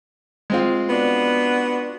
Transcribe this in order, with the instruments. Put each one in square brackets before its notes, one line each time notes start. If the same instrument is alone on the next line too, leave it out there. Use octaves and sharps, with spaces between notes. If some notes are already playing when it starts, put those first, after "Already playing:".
[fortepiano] G#3 C4 F4
[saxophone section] B3 D4 F#4